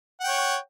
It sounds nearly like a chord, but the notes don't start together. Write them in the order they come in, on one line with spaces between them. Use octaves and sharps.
F#5 G5 C#5